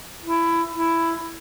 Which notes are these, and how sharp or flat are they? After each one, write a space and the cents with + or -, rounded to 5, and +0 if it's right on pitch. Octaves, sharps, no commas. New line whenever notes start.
E4 +20
E4 +10